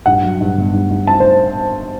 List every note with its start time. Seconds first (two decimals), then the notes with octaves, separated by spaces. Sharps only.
0.06 G2 F#5
0.23 F#3
0.41 G2
0.57 G1
0.73 G2
0.91 G2
1.07 C4 A5
1.20 C5